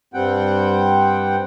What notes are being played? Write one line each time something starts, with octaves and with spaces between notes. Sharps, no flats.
G2 G3 C4 F#5 G5